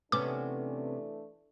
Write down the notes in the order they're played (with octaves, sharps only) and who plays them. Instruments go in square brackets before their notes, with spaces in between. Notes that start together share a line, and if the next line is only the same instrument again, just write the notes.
[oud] C3 B3 C#4 [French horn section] E3 A3 D4 [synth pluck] D6